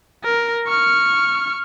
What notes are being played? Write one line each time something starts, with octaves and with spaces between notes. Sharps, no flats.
A#4
C#6 F6